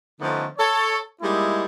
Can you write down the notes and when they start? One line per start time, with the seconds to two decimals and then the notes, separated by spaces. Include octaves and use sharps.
0.20 D3 F3 A3 B3 C#4 D#4
0.59 A4 C#5
1.21 G3 G#3 A#3 D#4 E4